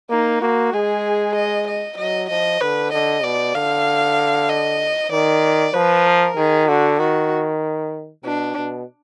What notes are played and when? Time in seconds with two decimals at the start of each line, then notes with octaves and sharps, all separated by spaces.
0.10 A#3 D#4
0.41 A#3 F#4
0.73 G#3 G#4
1.35 D#5
1.67 D#5
1.98 F#3 D#5
2.30 F3 D#5
2.61 D3 B4
2.93 D3 D#5
3.23 B2 D5
3.54 D3 F5
4.49 D#5
5.11 D#3 D5
5.74 F3 B4
6.05 A#4
6.37 D#3 G#4
6.68 D3 F#4
6.99 D#3 F#4
8.24 B2 D4
8.56 B2